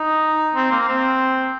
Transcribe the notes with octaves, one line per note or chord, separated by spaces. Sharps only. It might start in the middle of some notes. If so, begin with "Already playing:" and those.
Already playing: D#4
C4
A#3
C4